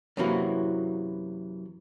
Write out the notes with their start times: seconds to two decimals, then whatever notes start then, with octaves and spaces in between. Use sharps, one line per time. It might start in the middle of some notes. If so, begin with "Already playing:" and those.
0.17 F#2 C3 E3 A#3 E4 F#4